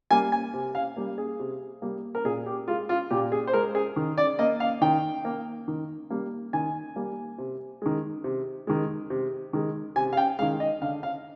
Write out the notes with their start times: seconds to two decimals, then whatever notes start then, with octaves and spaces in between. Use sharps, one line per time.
0.11 G3 A#3 G#5
0.32 G#5
0.53 C3
0.75 F5
0.97 G3 A#3
1.18 G#4
1.39 C3
1.82 G3 A#3
2.15 A#4
2.25 A#2 G#4
2.46 G4
2.68 G#3 F4
2.89 F4
3.10 A#2 G4
3.32 G#4
3.47 C5
3.53 G#3 A#4
3.75 G#4
3.96 D#3
4.18 D5
4.39 A#3 D#5
4.60 F5
4.81 D#3 G5
5.25 A#3
5.68 D#3
6.10 G3 A#3
6.53 D#3 G#5
6.96 G3 A#3
7.38 C3
7.82 D#3 G#3
8.24 C3
8.67 D#3 G#3
9.10 C3
9.53 D#3 G#3
9.96 C3 G#5
10.13 F5
10.17 G5
10.39 G#3 F5
10.42 D#3
10.60 D#5
10.82 D3 F5
11.03 F5